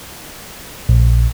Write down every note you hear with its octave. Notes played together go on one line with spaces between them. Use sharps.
A#1